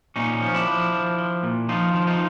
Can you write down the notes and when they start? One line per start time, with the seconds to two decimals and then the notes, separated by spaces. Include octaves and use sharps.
0.16 A#2 C#4 D#4
0.42 F3
0.54 D4 E4
0.67 F3
0.93 F3
1.18 F3
1.43 A#2
1.69 F3 D#4 F4
1.94 F3
2.07 D#4 F4